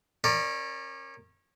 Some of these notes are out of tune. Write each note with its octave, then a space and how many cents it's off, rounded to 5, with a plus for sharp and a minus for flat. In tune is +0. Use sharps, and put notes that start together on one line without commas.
C#4 -25 A#4 +0 D5 +15